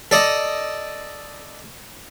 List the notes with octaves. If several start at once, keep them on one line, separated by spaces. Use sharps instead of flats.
A4 D5 D#5